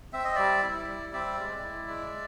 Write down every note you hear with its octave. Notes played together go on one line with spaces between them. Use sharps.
C4 E5
D#5
G3 D5 E5
E4
G3
C4 D5 E5
G#3
E4
G#3